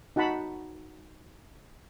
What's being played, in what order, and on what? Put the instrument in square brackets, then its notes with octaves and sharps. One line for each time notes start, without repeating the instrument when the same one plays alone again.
[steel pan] D#4 F#4 F#5 A5 B5